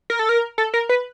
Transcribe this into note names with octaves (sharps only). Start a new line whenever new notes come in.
A#4
A4
A#4
A4
A#4
B4